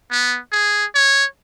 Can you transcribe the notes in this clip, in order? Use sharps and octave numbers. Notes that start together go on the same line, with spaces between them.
B3
G#4
C#5